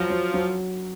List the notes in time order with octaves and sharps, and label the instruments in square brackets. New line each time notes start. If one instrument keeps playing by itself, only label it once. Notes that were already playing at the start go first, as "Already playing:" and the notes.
Already playing: [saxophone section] F3 [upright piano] F#3
[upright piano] F#3
F#3